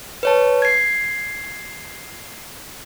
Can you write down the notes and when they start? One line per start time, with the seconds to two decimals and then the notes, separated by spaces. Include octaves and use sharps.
0.23 B4 C#5 A5
0.62 G#6 C7